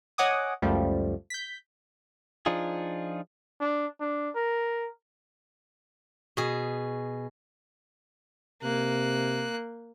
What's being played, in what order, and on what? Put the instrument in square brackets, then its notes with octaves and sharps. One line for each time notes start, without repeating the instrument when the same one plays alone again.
[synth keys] C#5 D#5 F#5 G#5 D6 D#6
C#2 F#2 F3 G3 A3
G6 B6
[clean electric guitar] F3 D4 D#4 F4 G#4
[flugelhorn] D4
D4
A#4
[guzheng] B2 G#4
[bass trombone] C3 [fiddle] A#3 F#6